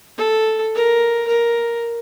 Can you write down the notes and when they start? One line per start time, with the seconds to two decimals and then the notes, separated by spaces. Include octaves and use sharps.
0.18 A4
0.75 A#4
1.28 A#4